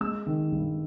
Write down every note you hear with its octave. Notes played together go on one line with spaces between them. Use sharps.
G#3 E6
D#3
G2